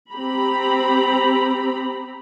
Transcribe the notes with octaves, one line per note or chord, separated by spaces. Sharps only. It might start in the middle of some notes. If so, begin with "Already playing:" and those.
C4 G4 A#5 B5